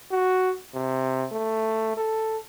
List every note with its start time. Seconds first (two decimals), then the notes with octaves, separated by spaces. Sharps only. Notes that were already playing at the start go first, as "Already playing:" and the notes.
0.11 F#4
0.75 C3
1.32 A3
1.97 A4